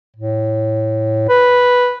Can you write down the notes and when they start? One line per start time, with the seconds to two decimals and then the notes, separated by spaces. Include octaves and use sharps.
0.17 A2
1.29 B4